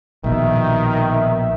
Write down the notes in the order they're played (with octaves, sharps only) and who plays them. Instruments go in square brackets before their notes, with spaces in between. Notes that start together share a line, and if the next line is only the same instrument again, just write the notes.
[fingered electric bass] A#1 B2 [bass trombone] D#3 [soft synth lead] E5